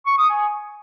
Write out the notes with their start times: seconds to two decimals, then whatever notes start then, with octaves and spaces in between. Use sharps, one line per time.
0.06 C#6
0.18 D#6
0.29 G#5